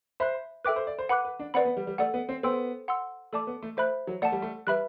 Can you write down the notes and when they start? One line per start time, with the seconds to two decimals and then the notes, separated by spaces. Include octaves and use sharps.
0.20 C5 E5 B5 F#6
0.65 A4 B4 E5 G5 D6 F#6
0.76 C5
0.87 D5
0.99 C5
1.09 B4 F#5 B5 D6 F#6
1.25 B4
1.39 D4
1.54 C4 B4 D5 F#5 B5
1.65 B3
1.77 G3
1.87 G3
1.98 A3 A4 D5 F#5
2.14 B3
2.29 C4
2.43 B3 A4 C5 G5 C6 E6
2.88 F#5 C6 E6
3.33 A3 A4 D5 A5 D6
3.47 B3
3.62 A3
3.77 A3 C5 E5 B5 F#6
4.07 F#3
4.22 A3 D5 F#5 A5
4.32 G3
4.42 A3
4.67 G3 B4 E5 B5 F#6